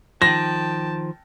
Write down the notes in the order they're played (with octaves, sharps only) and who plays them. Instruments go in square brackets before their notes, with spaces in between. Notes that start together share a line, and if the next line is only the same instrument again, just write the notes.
[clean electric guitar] D#3 F3 [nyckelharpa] G5 A5 [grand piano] A#6